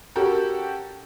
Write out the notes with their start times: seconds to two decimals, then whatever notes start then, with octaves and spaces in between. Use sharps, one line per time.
0.16 C#4 F#4 G4 A4 A#4